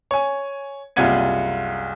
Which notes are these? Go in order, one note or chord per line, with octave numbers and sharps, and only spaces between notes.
C#5 G#5
F#1 C2 F4 F#5 G#6 D#7